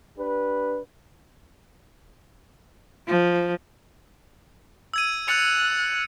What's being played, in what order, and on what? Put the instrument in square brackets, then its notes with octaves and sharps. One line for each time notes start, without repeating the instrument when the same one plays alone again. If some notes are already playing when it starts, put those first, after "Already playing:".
[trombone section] D4 G4 B4
[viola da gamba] F3
[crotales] E6 G#6 D#7
[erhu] F#6 [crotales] A6 C#7 F7